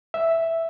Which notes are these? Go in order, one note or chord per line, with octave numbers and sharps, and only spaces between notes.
E5